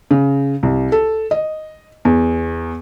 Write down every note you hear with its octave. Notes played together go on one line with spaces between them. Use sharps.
C#3
C2
A4
D#5
E2